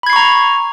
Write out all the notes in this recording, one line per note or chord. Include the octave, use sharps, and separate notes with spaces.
A#5 B5 C#6 G#6 C7